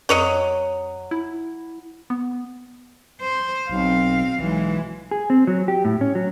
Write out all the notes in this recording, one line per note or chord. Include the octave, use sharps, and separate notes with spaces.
F2 F#3 C#5 D#5
E4
B3
C5
B1 C4 F5
B1 E3 G#3
G#4
C4
F#3
G4
A2
C#4
F#3